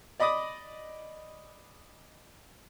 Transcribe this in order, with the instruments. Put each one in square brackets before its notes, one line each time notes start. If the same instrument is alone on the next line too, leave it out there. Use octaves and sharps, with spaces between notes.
[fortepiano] D5 D#5 B5 D6 D#6